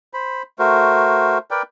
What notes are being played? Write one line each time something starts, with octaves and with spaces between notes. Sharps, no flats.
C5 B5
A3 F#4 A#4 C5
A#4 B4 D5 G5